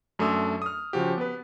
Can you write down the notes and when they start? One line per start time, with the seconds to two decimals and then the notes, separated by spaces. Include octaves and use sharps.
0.19 F#2 A3 D4 D#6 E6
0.62 D#6 F6
0.93 C#3 F3 F#4 G4
1.18 B3 B4